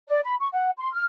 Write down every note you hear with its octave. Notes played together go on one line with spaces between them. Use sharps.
D5
B5
C#6
F#5
C6
F6